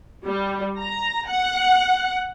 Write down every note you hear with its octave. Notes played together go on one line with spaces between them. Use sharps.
G3
A#5
F#5